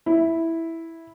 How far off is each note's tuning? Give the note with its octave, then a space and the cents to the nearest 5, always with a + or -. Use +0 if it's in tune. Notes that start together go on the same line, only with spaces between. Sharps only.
E4 -5